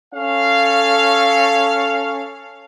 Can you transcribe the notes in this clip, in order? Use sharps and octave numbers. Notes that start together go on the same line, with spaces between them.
C#4 A4 F5